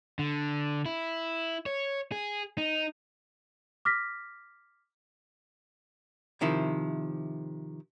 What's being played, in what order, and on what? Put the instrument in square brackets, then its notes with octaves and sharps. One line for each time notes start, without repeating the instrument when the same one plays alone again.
[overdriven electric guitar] D3
E4
C#5
G#4
D#4
[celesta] D6 F6 A#6 B6
[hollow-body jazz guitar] C3 D#3 F3 E4